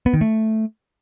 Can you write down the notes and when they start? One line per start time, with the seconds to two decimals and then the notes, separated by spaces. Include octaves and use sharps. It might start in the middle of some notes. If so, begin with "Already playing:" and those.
0.06 B3
0.14 D#3
0.21 A3